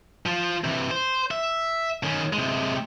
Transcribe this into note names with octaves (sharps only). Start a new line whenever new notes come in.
F3 F4
C3 E3
C5
E5
D#3 C#4
C3 G#3